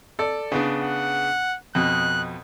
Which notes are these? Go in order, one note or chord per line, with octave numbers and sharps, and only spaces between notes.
A4 D5
C#3 B3 D4
F#5
F2 B2 F#6